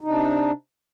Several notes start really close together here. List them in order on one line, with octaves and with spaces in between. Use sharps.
D#4 C3 D4